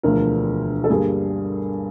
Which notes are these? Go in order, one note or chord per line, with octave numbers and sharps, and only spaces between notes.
E1 D2 D3 F3 A3 A#4
A4
G2 D3 G3 A#3 G#4